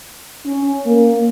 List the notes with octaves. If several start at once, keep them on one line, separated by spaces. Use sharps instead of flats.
C#4
A#3